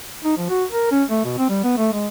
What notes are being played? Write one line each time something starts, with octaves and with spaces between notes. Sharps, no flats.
D#4
F3
F#4
A#4
C#4
A3
B2
C4
G3
B3
A3
G#3